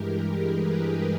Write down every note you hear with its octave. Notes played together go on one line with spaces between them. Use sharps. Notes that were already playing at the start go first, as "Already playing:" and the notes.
Already playing: G2 E3 G#3 G4 A#4
G#4 B4
G4 A#4